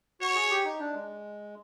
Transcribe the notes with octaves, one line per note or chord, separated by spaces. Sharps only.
F#4 C#5
G#4
G4
D#4
D4
G#3